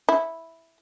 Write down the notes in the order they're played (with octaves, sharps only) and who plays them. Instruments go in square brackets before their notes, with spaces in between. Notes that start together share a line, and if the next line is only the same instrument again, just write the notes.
[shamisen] E4